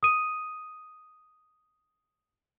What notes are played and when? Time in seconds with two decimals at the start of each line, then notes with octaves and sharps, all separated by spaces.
0.03 D#6 D#7